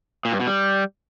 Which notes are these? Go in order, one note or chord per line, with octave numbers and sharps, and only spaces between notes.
A#2
G2
B2
G3